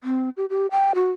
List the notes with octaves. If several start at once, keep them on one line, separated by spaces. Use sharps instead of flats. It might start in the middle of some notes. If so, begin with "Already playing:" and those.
C4
G4
G4
G5
F#4